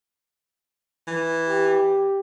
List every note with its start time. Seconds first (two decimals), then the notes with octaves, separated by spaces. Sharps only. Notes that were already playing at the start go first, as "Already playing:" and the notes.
1.07 E3
1.47 G4